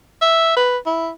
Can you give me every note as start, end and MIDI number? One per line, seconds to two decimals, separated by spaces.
0.22 0.55 76
0.57 0.77 71
0.86 1.09 64